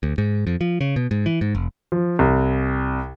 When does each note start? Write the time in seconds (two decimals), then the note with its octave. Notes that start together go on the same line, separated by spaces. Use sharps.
0.03 D2
0.18 G#2
0.47 F2
0.61 F3
0.81 C#3
0.96 B2
1.11 G#2
1.26 E3
1.41 G#2
1.55 F1
1.92 F3
2.19 C2